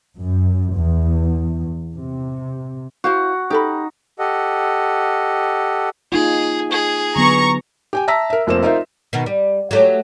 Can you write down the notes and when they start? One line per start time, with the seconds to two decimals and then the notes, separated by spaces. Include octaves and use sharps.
0.18 F#2
0.77 E2
1.96 C3
3.04 E4 F#4 C5 F5
3.50 D#4 G4 A4 B5
4.19 G4 A4 D#5 F#5
6.12 A#3 D#4 F4 G#4
6.71 G#4
7.16 D3 F#3 B3 A#5 C#6
7.93 G4 G5 G#5
8.08 E5 A5 A#5 E6 A#6 B6
8.30 A#4 E5
8.47 F1 F3 A#3 C4 E7
8.63 D#4 F4 A#4 C5 E5
9.13 B2 D#3 B3
9.26 G3
9.71 F#3 A3 G4